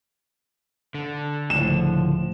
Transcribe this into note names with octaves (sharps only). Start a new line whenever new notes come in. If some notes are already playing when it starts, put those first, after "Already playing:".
D3
C#2 A2 F3 E7